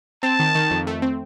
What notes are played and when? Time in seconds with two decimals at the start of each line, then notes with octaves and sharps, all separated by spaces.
0.23 C4 A5
0.39 D#3
0.55 D#3
0.71 F2
0.87 A3
1.02 C4